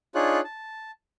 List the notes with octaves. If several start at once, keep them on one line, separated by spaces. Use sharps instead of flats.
D4 D#4 F4 G#4 C#5 F#6
A5